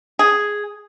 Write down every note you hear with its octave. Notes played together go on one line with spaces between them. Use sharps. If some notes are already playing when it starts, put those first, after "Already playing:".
G#4